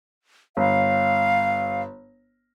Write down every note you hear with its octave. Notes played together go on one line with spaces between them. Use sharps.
G1 F5